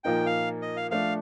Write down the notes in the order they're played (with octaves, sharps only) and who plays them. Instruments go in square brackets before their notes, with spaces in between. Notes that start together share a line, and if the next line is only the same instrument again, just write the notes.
[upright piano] A#2 F3 A#3 D#4 [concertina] G5
[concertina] F5
D#5
F5
[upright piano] F3 A3 D4 [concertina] F5